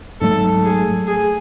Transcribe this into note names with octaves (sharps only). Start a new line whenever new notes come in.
G#2 F#3 A3 A4
G#4
G#4